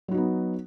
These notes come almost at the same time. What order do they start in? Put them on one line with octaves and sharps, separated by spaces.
F#3 F#4 D#4 B3